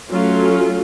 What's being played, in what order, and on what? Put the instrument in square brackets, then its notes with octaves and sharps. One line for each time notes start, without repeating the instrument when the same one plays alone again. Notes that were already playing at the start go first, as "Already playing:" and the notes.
[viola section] F#3 A3 C#4 F4